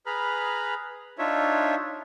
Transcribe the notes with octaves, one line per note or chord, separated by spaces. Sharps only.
G#4 B4 A#5 B5 F6
D4 D#4 F4 C#5 E5